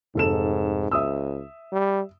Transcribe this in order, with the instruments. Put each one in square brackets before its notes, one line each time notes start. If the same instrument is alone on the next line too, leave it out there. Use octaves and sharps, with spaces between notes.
[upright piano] F1 A4 E7 [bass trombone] G#2
[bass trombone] C#2 [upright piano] E5 D#6 E6
[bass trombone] G3